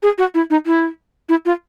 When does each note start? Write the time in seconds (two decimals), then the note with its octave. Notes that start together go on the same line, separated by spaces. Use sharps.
0.03 G#4
0.18 F#4
0.34 E4
0.50 D#4
0.66 E4
1.29 E4
1.46 F4